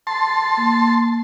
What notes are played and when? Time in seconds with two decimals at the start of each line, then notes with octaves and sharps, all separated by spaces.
0.07 A5 C6
0.57 A#3